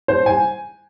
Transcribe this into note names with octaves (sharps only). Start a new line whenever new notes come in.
C5
G#5